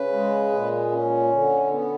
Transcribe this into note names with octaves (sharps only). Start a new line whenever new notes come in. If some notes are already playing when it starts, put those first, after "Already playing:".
Already playing: C#3 B4
G#3
A#2
C#4
D3
B3